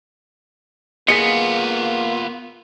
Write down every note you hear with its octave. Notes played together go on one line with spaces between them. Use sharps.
A#3 B3 F4 G#4 D#5 B6 C#7